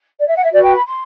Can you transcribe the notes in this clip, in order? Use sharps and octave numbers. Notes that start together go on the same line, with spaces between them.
D5
E5
F#5
E5
F#4 B4 D5
G5
B5
C6